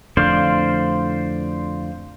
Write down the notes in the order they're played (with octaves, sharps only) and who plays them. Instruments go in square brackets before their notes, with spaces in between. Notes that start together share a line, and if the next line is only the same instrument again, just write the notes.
[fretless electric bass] F2 A2 D3 [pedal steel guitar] C5 D5 F5